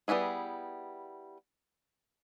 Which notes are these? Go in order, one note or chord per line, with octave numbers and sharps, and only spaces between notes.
G3 B3 C#4 E4 G#4